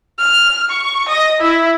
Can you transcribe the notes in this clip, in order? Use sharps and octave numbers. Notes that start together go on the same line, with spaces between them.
F6
C#6
D#5
E4